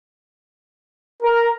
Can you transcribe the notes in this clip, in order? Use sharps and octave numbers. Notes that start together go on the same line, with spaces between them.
A#4